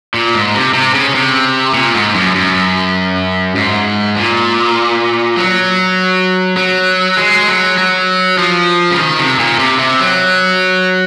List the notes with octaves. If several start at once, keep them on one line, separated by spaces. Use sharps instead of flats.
A#2
G#2
C3
C3
C#3
C3
A#2
G#2
F#2
F#2
G#2
A#2
F#3
F#3
G#3
F#3
F#3
F3
C#3
D#3
C3
A#2
C3
C3
F#3